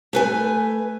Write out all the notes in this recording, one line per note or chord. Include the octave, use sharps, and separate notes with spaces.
A3 B4 G#5